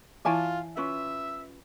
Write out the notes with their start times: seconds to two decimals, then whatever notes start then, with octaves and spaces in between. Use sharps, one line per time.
0.25 E3 E4 F4 E5 G#5 A5
0.77 C#4 F4 B4 E5